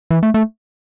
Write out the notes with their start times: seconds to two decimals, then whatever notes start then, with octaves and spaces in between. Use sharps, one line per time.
0.11 E3
0.23 A3
0.34 A3